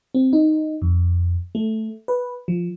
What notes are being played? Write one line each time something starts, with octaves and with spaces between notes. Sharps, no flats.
C4
D#4
F2
A3
B4
F3